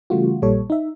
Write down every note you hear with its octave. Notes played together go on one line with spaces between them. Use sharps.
C#3 E3 G3 A3 F4 F#4
A#1 A#2 G3 A4 C#5
D#4 E5